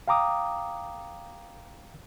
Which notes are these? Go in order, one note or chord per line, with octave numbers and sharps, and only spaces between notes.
F5 G5 A#5 D6 D#6